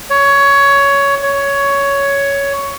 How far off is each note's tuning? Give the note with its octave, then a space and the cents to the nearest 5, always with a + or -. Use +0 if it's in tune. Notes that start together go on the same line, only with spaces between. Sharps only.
C#5 +15
C#5 +10